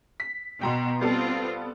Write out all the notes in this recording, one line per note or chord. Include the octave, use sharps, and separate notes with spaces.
B6
B2 G5 A#5 C6
G3 B3 C4 F4 A4